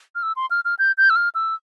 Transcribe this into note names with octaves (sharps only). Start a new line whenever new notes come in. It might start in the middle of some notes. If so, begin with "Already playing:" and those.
F6
E6
C6
F6
F6
G6
G6
E6
F6
E6